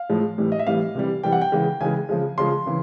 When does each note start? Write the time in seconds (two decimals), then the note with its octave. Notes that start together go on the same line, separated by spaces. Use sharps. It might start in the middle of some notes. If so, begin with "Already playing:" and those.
Already playing: F5
0.10 A2 F3 G#3
0.38 A2 E3 G3
0.52 D#5
0.59 E5
0.67 A2 E3 G3 F5
0.95 C3 E3 G3
1.23 C3 E3 G3 G5
1.32 F#5
1.41 G5
1.52 C#3 E3 G#3
1.81 C#3 E3 G#3 G#5
2.09 C#3 F3 G#3
2.38 C#3 F3 G#3 C6
2.66 C#3 E3